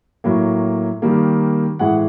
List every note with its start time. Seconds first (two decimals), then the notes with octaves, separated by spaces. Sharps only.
0.24 A2 F#3 A#3
1.02 D#3 G3 A#3
1.79 A2 E3 G#3 F#5